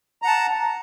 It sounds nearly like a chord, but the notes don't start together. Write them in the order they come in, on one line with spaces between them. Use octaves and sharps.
A#5 F#5 A5